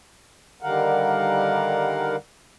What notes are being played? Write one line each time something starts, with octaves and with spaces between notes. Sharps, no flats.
D3 D#3 G3 A#4 F5 F#5